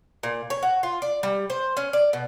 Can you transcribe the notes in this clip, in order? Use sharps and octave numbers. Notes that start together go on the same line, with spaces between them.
A#2
C#5
F#4
F4
D5
G3
C5
C#4
D5
B2